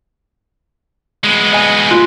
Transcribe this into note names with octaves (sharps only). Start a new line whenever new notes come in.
G#3 B3
D#5 G#5
F4